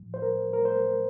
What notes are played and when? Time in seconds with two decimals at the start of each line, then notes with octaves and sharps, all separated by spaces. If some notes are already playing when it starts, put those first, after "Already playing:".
Already playing: A2 F3
0.14 C5
0.22 A#4
0.53 A#4
0.65 C5